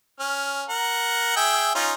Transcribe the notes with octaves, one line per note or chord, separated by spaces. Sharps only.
C#4 F6
A#4 F#5
G#4 E5 G5
C#4 D#4 F4